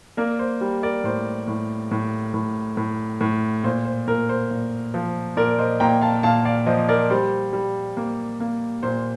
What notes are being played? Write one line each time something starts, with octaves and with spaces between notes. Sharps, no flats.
A#3 A#4 D5
C5
G3
A#4 D5
A2 C5
A2
A2
A2
A2
A2
A#2 C5
C5
A#2 A#4
C5
A#2
F3
A#2 A#4 D5
C5 D#5
A#2 G5 A#5
F5 A5
A#2 F5 A5
D5 F5
F3 C5 D#5
A#4 D5
G3 C5
G3
A#3
A#3
A#2 C5